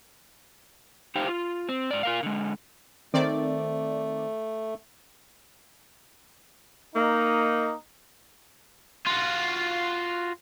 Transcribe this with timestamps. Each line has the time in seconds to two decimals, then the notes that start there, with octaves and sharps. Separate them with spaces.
1.15 D#4 G4 C5 F5 G5
1.28 F4
1.69 C4
1.91 G#2 D5
2.03 F4 A#4 F5
2.23 D3 G#3
3.14 D#3 A3 C4 D5
6.96 A#3 D#4
9.07 F4 F#4